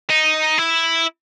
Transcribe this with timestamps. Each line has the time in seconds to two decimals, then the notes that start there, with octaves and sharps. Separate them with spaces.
0.10 D#4
0.58 E4